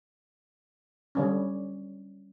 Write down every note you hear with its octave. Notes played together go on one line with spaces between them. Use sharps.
D3 G3 C#4